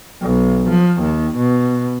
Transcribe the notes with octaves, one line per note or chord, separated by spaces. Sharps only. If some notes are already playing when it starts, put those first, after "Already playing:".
B1
F3
D#2
B2